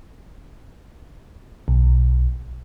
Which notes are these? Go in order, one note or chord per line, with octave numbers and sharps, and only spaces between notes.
B1